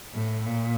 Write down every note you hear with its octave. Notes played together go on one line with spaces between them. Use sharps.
A2
A#2